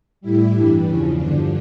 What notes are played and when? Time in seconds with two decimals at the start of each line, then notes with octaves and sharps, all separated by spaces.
0.21 A2 G3 E4
0.53 G2 E3 G3 D4
0.86 E2 C#3 F3 C#4
1.17 G2 D3 F3 D4